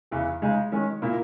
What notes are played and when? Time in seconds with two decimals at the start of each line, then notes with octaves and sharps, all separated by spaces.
0.11 E2 C#3 E3
0.42 C#3 G#3 D#4 G#4
0.72 D#3 G#3 C#4
1.02 A#2 A#3 E4